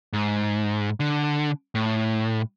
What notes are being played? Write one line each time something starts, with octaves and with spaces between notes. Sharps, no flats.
G#2
D3
A2